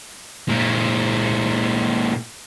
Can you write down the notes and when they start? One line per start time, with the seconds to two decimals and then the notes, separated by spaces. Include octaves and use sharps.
0.49 A#2 G#3